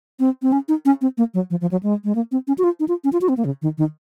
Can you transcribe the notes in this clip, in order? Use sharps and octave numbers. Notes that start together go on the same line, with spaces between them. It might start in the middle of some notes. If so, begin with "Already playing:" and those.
C4
C4
C#4
D#4
C#4
C4
A#3
F#3
F3
F3
F#3
G#3
G#3
A#3
C4
C#4
F#4
F4
D#4
F4
C#4
F4
F#4
C4
A#3
C#3
D#3
D#3